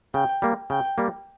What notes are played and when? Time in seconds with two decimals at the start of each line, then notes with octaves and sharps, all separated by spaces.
0.14 C#3 G5
0.42 G3 A#3
0.70 C#3 G5
0.98 G3 A#3